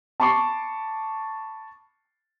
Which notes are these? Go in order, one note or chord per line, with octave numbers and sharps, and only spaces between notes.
A5 B5 C#6 D6 C7